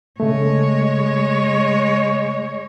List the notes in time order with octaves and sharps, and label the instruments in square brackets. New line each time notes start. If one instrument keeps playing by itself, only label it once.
[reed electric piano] C#3 A3 [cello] G#3 C#5